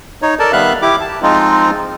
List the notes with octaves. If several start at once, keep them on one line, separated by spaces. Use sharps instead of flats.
D#4 C#5
A4 A#4 D5 A5
D#3 G3 B3 E5 F5 F#6
E4 G4 D6
A5
F3 G#3 C4 D#4 F4